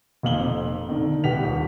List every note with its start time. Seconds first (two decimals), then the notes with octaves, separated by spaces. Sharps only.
0.23 F1 F2 A#2 F5 F#7 G7
0.89 D3 D#3
1.24 C2 G4 B4 F#5 B6 F7
1.43 D#1